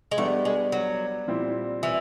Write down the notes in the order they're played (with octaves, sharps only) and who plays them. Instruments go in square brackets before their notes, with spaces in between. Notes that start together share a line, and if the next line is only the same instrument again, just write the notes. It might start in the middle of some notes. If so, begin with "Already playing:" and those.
[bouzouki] G#3
[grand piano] G3 B3 D4 [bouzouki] A3
[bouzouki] G#3
F#3
[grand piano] A#2 G3 C4 E4
[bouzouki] E3